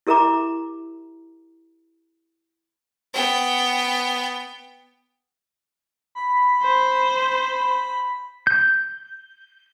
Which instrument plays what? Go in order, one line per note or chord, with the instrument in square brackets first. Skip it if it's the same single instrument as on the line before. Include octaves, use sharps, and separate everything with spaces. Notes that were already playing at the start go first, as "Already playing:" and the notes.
[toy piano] E4 G4 A#4 E5 A#5 D6
[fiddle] B3 G5
[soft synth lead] B5
[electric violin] C5
[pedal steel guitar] G6